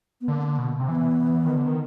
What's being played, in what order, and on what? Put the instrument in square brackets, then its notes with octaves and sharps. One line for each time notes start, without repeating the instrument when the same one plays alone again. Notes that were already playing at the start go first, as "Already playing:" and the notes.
[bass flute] B3
[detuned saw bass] D3 [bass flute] A#3
[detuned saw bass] B2
C3
[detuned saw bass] E3 [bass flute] B3
[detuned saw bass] E3
E3
D#3
D3
D#3